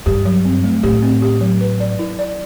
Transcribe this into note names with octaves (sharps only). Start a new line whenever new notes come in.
G2 G4
F#3
C4
A3
A2 G4
C4
G4
F#3
B4
D5
E4
D5